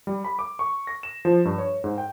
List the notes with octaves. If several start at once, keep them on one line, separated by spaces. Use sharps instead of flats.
G3
B5
D6
C#6
A#6
E7
F3
G2
C#5
G#2
G5